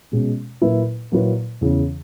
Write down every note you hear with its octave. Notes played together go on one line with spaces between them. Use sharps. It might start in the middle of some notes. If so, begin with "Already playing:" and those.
B2 G#3 C#4
A#2 F#3 A#3 E4 B4
A#2 F#3 A#3 E4 B4
E2 C#3 E3